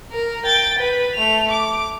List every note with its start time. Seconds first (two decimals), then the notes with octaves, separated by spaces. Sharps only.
0.12 A#4
0.45 G5 A6
0.79 B4
1.16 A3 F7
1.51 D6